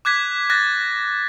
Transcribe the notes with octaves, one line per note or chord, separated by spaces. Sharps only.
D6 F#6 G#6 B6
F#6 A6 A#6